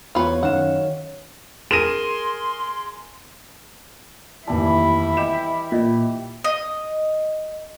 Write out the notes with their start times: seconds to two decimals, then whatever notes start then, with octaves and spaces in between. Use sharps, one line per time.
0.15 E2 F4 F#4 B4 C#5
0.43 F#2 D#3 F5 F#5 E7
1.71 G#4 A#4 C6 A#6 D#7 E7
4.47 F1 D#2 E3 G3 E4 A5
5.17 G4 D#5 E7
5.72 A#2 D#5
6.44 D#5